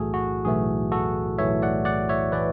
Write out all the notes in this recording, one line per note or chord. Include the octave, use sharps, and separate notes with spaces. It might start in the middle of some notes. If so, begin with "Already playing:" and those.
Already playing: B1 A2 E3 A3 F#4 G#4 A4
F#4
B1 A2 E3 A3 G#4
F#4 A4
B1 A2 E3 A3 C#5 E5
D5 F#5
D5 F#5
C#5 E5
A2 E3 A3 B4 D5